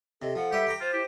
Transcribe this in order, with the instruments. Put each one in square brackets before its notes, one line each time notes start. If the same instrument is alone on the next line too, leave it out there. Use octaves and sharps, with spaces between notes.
[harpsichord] C3 [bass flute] A4 [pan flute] D#5
[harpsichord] F3 [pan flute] F#5
[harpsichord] G3 B4 E5 [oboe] G4
[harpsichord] G5 A#5 D6
[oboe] F4 [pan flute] C5
[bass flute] E4 [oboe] G4